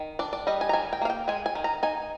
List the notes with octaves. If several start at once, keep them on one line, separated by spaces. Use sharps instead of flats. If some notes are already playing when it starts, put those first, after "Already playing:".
Already playing: D#3
D4 D5
D5
G3 D#5
G#5
A#5
D#3 G#5
G5
A#3 F5
G5
G#3 G#5
G#5
D#3
A#5
D#4 G#5